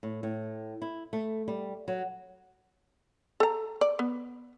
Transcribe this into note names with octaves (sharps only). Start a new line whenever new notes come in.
A2
A2
E4
A3
G3
F#3
A4 A#5
D5
B3